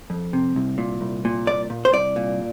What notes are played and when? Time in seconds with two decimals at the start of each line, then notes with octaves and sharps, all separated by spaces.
0.10 F2
0.33 C3
0.56 C2
0.78 A#2
1.01 C2
1.25 A#2
1.47 C2 D5
1.70 A#2
1.85 C5
1.93 C2 D5
2.16 A#2